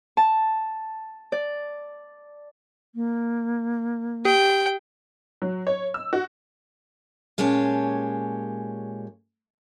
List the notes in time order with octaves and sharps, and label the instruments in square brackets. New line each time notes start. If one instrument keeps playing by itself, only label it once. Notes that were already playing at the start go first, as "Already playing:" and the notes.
[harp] A5
D5
[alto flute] A#3
[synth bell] G4 [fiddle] G5
[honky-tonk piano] F#3
C#5
E6
F#4
[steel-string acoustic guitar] A#2 G#3 C#4 G4 C#5 A5